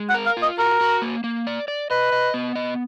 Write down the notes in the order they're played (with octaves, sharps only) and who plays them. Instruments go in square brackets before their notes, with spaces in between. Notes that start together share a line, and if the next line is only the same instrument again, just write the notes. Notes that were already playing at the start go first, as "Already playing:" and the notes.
Already playing: [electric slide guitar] G#3
[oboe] F#5
[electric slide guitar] A#4
[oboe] F5
[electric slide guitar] F4
[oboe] D#5
[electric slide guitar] F#4 [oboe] A#4
[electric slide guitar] F#4
A#3
A#3
D5
D5
[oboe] B4 [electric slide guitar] D#5
[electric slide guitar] D#5
B3
D#5